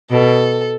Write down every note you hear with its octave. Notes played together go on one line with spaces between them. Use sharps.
B2 A4